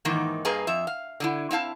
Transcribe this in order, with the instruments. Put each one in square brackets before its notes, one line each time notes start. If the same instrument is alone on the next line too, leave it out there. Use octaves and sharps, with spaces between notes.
[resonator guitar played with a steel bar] G#2 D#3 E3 A#3 D#4
G2 A#3 G#4 B4 D#5 A#5
F2 E5
F5
D3 D#4 E4
C4 E4 F5 A5